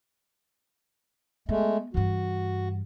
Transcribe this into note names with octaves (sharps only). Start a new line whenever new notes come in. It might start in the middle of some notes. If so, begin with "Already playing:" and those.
G#3 A3 B3
G2 E3 F#4